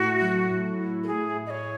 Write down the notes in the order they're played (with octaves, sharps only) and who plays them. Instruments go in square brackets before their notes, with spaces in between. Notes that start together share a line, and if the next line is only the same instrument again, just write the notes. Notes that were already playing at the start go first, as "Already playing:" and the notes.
Already playing: [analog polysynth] A2 A3 E4 [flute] F#4
[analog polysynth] F#3
A2
E4
[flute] A4
[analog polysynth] A2 [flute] G#4
[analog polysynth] A2
[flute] D#5
C#5